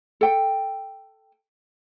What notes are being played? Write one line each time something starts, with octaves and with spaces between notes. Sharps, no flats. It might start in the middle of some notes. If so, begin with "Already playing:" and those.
A4 G5